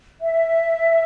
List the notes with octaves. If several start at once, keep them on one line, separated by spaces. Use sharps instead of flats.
E5